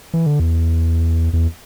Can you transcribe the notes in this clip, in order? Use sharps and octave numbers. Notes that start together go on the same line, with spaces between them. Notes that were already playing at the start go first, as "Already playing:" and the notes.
E3
D3
E2
E2